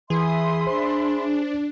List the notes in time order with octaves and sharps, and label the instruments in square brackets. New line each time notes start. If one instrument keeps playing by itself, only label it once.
[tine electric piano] E3 [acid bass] G#4 [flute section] E5 B5 C6 [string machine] D#6
[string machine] D4 [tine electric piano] C5